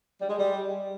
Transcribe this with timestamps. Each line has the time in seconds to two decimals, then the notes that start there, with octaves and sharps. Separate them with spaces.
0.20 G3
0.29 G#3
0.37 G3